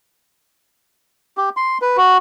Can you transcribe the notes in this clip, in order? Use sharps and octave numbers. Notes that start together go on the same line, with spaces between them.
G4
C6
B4
F#4